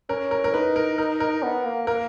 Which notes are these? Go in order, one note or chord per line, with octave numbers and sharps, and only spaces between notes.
C#4 A#4
A#4
A#4
D#4 B4
A#4
A#4
A#4
B3
A#3
A#3 A#4